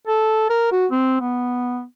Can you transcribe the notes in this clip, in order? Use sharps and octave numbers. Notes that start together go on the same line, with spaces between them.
A4
A#4
F#4
C4
B3